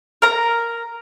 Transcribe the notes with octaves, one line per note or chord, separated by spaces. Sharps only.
A#4 A#5